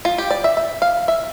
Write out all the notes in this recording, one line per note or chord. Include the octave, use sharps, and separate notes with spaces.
F4
G4
D5
E5
E5
F5
E5